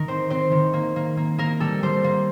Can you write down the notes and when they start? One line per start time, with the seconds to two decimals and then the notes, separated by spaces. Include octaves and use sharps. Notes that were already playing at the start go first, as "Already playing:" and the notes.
Already playing: D#3 A#4
0.08 C4 C5
0.30 C4 C5
0.52 D#3
0.73 A#3
0.96 A#3
1.17 A#3
1.38 A#3 A#4
1.60 G3 A4
1.83 G3 C5
2.04 A#3